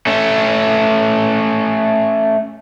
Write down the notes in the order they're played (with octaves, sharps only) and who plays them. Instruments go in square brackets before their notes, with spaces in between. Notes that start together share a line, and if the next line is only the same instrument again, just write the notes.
[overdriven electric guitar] A3 C#4